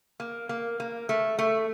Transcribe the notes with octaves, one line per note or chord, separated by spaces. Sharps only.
A#3
A#3
A#3
A3
A3